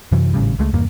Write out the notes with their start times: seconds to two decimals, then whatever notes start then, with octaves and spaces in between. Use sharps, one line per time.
0.12 F#2 C3 E3 F#3
0.34 G#1 A2 C#3 G3
0.59 C#2 G#3 A3
0.73 F1 E2 G2 A#3